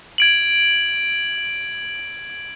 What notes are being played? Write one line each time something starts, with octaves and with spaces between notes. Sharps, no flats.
G#6 D7 F#7